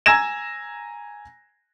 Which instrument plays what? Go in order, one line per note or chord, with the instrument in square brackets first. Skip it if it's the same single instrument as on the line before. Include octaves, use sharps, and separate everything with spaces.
[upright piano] G#5 A#5 E6 G#6 A#6 E7